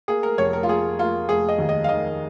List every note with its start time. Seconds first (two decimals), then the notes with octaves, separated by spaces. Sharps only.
0.08 A#3 G#4
0.23 A#4
0.38 F1 C#5
0.53 A#4
0.63 F4
0.68 A#3 G#4
0.99 A#3 F4
1.29 F1 G#4
1.49 D#5
1.59 D#2
1.69 D#5
1.84 F5
1.89 D#3 D#5